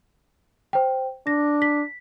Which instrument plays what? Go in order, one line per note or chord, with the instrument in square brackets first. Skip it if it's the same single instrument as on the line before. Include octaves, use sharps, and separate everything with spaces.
[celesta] C5 G5
[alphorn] D4 [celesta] A#6
[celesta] B6